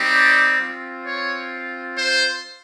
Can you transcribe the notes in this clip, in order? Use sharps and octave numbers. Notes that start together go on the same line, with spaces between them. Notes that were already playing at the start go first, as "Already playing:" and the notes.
Already playing: G3 C4 D#4 G4
D5
C4 F4
C#5
C5